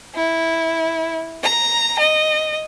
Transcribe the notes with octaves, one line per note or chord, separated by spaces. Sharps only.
E4
A#5
D#5